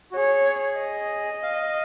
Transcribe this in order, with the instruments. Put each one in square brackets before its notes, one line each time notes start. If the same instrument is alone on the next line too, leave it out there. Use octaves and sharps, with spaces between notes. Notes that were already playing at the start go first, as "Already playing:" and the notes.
[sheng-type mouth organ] F#4
[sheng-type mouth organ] G#4 [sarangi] C#5
[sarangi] D#5
[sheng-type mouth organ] F5